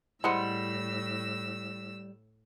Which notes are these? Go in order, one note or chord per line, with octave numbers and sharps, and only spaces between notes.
A2 G3 G#3 E4 C5 F#5 B5 E6